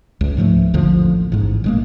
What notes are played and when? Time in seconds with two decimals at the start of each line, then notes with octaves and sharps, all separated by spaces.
0.21 C#2
0.37 G#2 F3 G3 A3
0.74 A1 D#2 D3 F3
1.32 A1 G#2
1.64 A#1 G#3 A#3